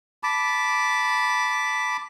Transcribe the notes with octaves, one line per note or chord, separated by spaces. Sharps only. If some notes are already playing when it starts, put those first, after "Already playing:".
A5 B5 D6